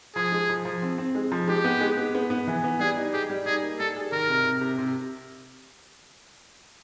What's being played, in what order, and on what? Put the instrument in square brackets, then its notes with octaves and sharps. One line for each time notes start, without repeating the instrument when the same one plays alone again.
[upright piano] F3 [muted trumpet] G#4
[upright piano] G#3
F3
F3
C4
C4
G#3
F3
[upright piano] G#3 [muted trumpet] G4
[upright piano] B3
G#3
B3
B3
B3
E3
B3
[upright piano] G3 [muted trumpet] G#4
[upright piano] D#4
[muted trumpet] G4 [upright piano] G#4
[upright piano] G3
[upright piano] D#4 [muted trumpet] G#4
[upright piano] A#3
[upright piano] G3 [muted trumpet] A4
[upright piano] G#4
[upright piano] D#3 [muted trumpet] A#4
[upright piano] C3
C3
C3
C3